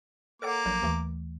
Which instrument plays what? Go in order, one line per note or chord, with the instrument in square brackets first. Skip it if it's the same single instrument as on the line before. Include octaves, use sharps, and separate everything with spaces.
[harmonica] A#3 D6 [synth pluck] A4 C#5 F#5
[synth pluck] A#1 F#3 G6
D#2 E3 A3